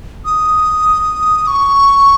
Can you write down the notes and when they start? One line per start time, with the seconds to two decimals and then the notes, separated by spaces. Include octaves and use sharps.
0.25 D#6
1.47 C#6